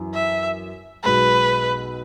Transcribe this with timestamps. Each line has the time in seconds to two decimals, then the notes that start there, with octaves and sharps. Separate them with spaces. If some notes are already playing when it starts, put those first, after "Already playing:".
Already playing: F#2 E3
0.14 E5
1.04 B1 B2 G#3 B4